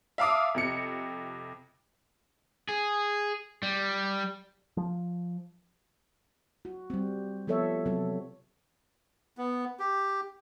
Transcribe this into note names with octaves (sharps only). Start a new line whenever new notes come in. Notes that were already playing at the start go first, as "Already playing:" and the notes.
E5 F5 A5 D6 D#6
F2 C3 C#7
G#4
G3
F3
F#4
G3 C4
F3 B3 A4 C#5 E5
C3 F#3 C4 A4
B3
G4